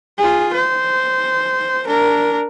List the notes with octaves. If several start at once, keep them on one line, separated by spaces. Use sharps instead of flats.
F4 G#4
C5
D4 A#4